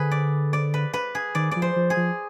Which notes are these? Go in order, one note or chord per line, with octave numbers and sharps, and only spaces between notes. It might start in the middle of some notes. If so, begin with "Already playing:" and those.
Already playing: D3 G#4 B4
D5
D5
B4
B4
G#4
D#3 D5
F3 D5
C5
F3
G#4
F3